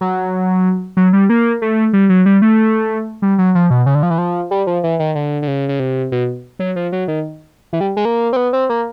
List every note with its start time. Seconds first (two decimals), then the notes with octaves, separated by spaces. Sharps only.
0.01 F#3
0.97 F#3
1.13 G3
1.29 A#3
1.62 A3
1.93 G3
2.09 F#3
2.26 G3
2.42 A3
3.22 G3
3.38 F#3
3.55 F3
3.70 B2
3.86 C#3
3.95 D3
4.03 F3
4.10 E3
4.18 F3
4.51 G3
4.67 F3
4.84 E3
4.99 D#3
5.15 D3
5.42 D3
5.48 C#3
5.69 C#3
5.80 C3
6.12 B2
6.59 F#3
6.76 F3
6.92 F#3
7.08 D#3
7.73 E3
7.81 G3
7.97 G#3
8.05 A#3
8.33 C4
8.36 B3
8.53 C4
8.69 A#3